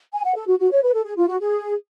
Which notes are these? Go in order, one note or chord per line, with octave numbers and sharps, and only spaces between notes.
G#5
F#5
A4
F#4
F#4
C#5
B4
A4
G#4
F4
F#4
G#4